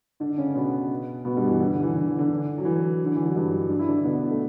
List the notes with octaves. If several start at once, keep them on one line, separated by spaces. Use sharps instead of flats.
D3 D4
C#3 C#4
B2 B3
B2 B3
G2 G3
E3
D3
D3
E3
D3
E3
D3
F#3
E3
D3
E3
F#3
G2 G3
D4
E4
D3 D4
B2 B3
A3